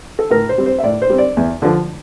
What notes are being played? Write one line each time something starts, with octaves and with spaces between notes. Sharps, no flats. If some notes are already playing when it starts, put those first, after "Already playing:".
A4
A2 A#4
C5
G3 C4
C5
E5
A2 D5
C5
G3 C4
D5
E2
D3 F3